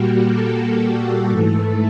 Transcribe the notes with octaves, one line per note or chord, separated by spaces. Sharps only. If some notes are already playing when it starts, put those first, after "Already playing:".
Already playing: A#2 G3 A#3 F#4 G4
A4
G#2 E3 A3